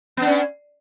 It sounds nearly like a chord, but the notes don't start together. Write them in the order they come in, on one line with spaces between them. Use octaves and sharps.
B3 D4 C#4